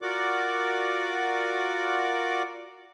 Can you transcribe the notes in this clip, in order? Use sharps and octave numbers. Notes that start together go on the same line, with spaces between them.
F4 F#4 A#4 D5 F#5 D6